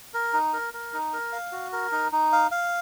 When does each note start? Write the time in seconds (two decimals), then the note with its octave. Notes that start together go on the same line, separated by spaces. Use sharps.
0.14 A#4
0.33 D#4
0.53 A#4
0.73 A#4
0.93 D#4
1.13 A#4
1.33 F5
1.52 F#4
1.72 A#4
1.92 D#4
2.12 D#4
2.32 F5
2.51 F5